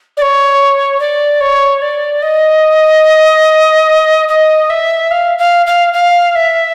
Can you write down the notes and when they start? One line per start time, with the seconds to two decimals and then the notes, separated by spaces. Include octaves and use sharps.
0.17 D5
0.22 C#5
1.00 D5
1.40 C#5
1.82 D5
2.22 D#5
4.28 D#5
4.70 E5
5.11 F5
5.38 F5
5.66 F5
5.93 F5
6.35 E5